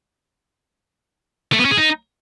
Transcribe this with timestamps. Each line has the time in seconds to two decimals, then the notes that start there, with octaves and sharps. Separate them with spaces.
1.53 A3
1.59 B3
1.65 C#4
1.71 G#4
1.77 D#4